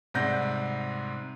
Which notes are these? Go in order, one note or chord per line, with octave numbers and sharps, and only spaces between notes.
G#2 C3 G3 F#5 G6 A#6